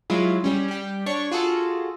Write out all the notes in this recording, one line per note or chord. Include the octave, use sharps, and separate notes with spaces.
F#3 G#3 E4 F4
G3 C#4
G3 G4
D4 C#5 C#6
F4 F#4 G#4 A4